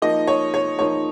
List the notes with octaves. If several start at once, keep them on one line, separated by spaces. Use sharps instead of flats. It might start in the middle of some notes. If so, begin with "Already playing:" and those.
F3 A#3 D#4 D#5
C#5
C#5
F3 A#3 D#4 C#5